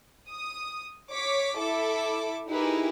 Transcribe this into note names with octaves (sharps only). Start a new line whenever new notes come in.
D#6
C#5 D6 B6
E4 A4 E5 D6
D#4 E4 G4 G#4 A#4 B4